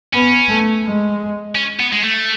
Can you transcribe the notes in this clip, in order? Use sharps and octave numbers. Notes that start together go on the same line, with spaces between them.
B3 C#4
A3
G#3
C#4
B3
G#3
A3